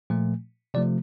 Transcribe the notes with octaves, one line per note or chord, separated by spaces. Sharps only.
A#2 F3 A3
C3 F3 A3 D5